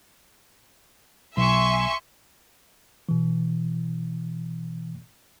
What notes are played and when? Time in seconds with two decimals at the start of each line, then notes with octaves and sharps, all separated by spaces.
1.37 B1 E5 G#5 C6 C#6
3.09 B2 E3